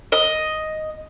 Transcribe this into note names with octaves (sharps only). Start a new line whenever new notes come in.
D#5